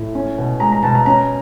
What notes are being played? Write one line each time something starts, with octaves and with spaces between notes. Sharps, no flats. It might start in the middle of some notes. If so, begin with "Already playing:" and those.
Already playing: A2
C#4
B2
G#3 A#5
A#5
B2 A5
A#5
C#4 A#5